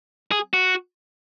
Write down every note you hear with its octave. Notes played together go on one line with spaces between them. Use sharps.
G#4
F#4